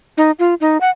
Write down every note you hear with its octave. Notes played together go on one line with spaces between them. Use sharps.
D#4
F4
D#4
F#5